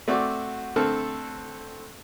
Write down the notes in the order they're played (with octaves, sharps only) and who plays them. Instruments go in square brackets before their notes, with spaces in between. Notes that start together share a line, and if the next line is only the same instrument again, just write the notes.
[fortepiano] A3 C4 F#4 D5 D6
D3 A3 C4 A4 F6